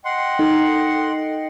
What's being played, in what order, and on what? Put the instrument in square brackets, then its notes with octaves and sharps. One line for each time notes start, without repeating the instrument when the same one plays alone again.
[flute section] D#5 G5 [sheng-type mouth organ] F#5 C6
[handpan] D#4 [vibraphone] A4